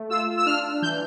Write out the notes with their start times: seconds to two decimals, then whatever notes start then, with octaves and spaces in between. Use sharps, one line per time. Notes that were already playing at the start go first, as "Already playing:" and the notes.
Already playing: A3
0.10 F4 E6
0.37 E6
0.46 D4 F6
0.82 E3 G6